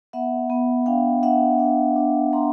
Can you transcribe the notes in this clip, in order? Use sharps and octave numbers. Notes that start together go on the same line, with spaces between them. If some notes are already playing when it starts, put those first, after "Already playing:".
B3 E5 F#5
B3
D4 F5 G5
D4 E5 F#5
D4
D4
D4 A#5 C6